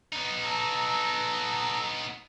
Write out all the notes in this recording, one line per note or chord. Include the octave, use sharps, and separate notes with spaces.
B3 D#4
A4 A#5 E6